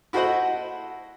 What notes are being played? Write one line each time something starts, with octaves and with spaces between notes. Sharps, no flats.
E4 F#4 A4 C5 D#5 F#5